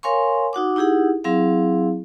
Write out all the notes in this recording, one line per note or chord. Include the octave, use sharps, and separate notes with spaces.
A#4 C#5 F5 G#5 C6 C#6
D#4 F#4 F#5 D6
D#4 E4 G4 G#4 F#5
F#3 C4 E4 G#4 F5